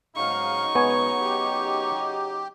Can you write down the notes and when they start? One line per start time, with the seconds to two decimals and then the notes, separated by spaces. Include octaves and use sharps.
0.16 G#2 C#3 F#3 D#4 F5 C#6
0.75 B2 G#3 B3 C#5 G#5
1.20 G4